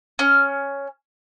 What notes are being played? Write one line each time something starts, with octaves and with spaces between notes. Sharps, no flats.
C#4 F6